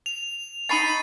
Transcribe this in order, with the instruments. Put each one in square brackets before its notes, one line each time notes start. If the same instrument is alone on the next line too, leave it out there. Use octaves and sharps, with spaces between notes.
[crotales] F7
[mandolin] D#4 B5 C#6 [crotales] A6 C7 D#7